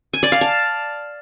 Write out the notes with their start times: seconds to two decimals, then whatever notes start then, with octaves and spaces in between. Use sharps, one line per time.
0.13 G#5
0.23 D5
0.32 F5
0.41 A5